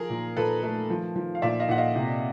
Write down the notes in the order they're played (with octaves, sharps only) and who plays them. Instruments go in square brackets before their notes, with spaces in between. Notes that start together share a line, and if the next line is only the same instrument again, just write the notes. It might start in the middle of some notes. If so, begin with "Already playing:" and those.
Already playing: [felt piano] F3 [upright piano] G#4 A#4
[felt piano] A#2
[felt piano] A#2 [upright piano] A4 B4
[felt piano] A3
F3
F3
[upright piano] F5
[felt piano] A#2 [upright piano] D5 E5
[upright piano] D#5 F5
[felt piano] A#2 [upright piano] F#5
[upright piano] D#5 F5
[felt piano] C3